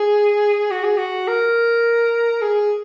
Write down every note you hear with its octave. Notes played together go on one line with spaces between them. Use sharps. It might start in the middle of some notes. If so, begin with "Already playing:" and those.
Already playing: G#4
F#4
G#4
F#4
A#4
G#4